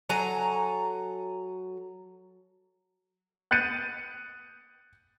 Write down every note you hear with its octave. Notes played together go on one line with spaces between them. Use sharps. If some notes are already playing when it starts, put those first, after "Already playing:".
F#3 A4 G#5 A#5
F#6 G6 A6 C#7 D#7